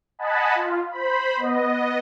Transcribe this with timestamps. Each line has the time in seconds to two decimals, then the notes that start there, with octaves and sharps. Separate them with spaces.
0.19 D#5 F#5 G#5 A5 B5
0.55 F4
0.91 C5 B5
1.36 B3 D#5